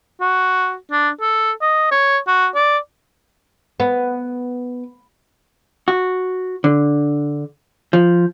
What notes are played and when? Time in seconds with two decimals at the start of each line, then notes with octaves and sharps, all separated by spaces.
0.21 F#4
0.91 D4
1.21 A4
1.61 D#5
1.91 C#5
2.27 F#4
2.55 D5
3.80 B3
5.88 F#4
6.64 D3
7.93 F3